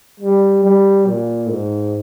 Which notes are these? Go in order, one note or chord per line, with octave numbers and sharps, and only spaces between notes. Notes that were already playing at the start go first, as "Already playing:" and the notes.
G3
G3
A#2
G#2